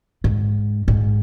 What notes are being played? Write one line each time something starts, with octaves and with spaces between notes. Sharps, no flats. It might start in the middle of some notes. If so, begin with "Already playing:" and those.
G#2
G#2